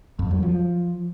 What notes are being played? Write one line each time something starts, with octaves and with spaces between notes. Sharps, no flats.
F2
F#3
F3